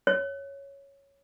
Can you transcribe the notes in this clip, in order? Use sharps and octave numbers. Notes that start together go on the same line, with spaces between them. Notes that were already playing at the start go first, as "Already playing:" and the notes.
C#5